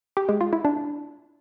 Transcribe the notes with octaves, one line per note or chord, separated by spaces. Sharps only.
G4
G#3
F4
E4
D4